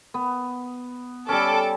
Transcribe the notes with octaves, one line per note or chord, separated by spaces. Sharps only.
B3
G3 C#4 A4 D6